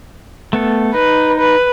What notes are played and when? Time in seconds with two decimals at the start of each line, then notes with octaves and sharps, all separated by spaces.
0.53 A3 B3 A4
0.94 D#4 B4
1.39 B4